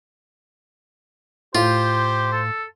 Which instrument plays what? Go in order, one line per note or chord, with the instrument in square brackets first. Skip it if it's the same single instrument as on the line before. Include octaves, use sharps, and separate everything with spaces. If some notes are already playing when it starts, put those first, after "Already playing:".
[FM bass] A2 [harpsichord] F4 [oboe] G4 [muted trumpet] C5
[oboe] A4